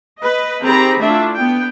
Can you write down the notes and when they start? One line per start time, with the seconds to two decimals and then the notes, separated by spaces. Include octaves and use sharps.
0.23 B4 D#5
0.62 D#3 C4 G4 G#4 A#5 B5
1.02 A3 D4 E4 F4 E5
1.37 B3 G5